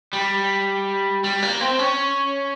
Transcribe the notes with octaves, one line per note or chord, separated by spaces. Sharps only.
G3
G3
A#3
C4
C#4